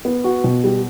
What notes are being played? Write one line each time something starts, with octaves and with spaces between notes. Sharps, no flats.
B3
F#4
B2
G3